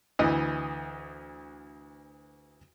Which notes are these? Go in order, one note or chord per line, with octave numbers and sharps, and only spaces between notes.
D2 E3 D#5